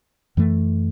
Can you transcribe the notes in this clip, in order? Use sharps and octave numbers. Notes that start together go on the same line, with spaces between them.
F#2 E3 A3